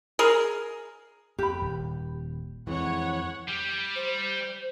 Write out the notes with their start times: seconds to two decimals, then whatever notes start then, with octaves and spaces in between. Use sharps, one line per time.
0.19 G#4 A#4
1.39 F2 G4 B5
1.62 D#1
2.67 F2 E3 G#3 C#5 F#5
3.48 G3
3.96 C5